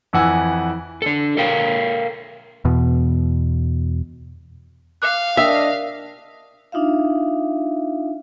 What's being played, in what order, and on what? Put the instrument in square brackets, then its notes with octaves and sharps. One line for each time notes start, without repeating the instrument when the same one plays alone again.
[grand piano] F2 E3 F#5 G#5 E6
[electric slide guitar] D4 A4
A4 A#4 F5 G5
[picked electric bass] E2 B2
[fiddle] F5 [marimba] D6 F#6
[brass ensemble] D4 D#5 [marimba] A#4 G5 [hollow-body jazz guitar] E5
[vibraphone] D4 D#4 F4 E5 F5